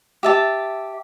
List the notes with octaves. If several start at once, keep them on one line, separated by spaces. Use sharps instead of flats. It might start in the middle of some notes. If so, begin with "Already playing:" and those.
G4 E5 A5